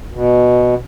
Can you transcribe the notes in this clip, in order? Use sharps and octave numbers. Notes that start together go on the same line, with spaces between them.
B2